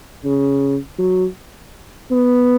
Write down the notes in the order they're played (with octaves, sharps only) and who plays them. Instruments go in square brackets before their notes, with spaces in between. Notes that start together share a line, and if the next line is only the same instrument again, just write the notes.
[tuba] C#3
F#3
B3